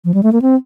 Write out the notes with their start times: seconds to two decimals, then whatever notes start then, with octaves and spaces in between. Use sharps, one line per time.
0.05 F3
0.14 G3
0.23 A3
0.33 A#3
0.42 C4